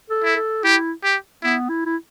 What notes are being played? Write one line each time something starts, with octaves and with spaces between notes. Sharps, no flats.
A4
E4
A4
E4 G4
G4
B3 E4
E4
E4